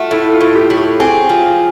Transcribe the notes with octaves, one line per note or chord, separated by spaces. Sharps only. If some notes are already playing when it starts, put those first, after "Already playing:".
Already playing: A3 F4 F#4
A2 E4
F4
A2
G4
F#3
G4
C4 G#4
F3